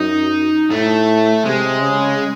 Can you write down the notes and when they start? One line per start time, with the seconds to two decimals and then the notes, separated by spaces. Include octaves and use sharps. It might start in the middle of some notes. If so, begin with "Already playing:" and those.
Already playing: F#2 D#4
0.71 A2 A3
1.45 C3 G#3
1.81 C#3